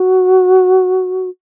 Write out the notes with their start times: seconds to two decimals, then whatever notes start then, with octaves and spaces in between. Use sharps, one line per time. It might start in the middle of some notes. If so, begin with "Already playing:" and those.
Already playing: F#4